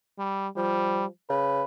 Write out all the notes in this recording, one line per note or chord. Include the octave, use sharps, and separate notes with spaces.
G3
F3 G3
C#3 B4